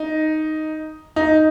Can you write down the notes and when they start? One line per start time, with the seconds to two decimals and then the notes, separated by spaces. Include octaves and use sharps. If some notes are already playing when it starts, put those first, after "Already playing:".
Already playing: D#4
1.16 D#4